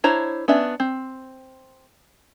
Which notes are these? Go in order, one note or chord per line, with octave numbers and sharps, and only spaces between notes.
D4 E4 C5 C#5 A#5
B3 C#4 D4 E5
C4